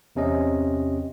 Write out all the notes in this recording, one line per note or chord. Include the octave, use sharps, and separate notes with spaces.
E2 C3 C#4 D#5